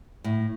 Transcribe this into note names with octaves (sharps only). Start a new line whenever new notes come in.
A2